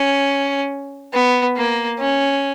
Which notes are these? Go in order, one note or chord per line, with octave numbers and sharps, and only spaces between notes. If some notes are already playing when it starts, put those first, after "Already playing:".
Already playing: C#4
B3
A#3
C#4